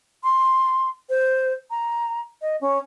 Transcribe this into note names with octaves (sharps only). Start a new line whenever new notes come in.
C6
C5
A#5
D#5
C#4